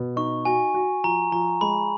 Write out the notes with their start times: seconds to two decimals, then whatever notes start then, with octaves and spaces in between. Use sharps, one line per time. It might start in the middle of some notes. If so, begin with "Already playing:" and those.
Already playing: B2
0.16 D#4 C#6
0.45 F#4 G#5
0.74 F#4
1.04 F3 A#5
1.32 F3 A#5
1.61 G#3 B5